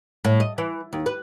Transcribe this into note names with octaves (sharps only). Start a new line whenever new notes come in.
A2
D#5
E3
D#2
B4